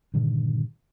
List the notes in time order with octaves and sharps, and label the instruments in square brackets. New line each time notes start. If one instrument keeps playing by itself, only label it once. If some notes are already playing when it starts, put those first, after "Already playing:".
[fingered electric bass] G2 A#2 D3 D#3